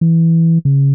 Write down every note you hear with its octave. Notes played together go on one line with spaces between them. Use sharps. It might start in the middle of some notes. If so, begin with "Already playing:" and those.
E3
C#3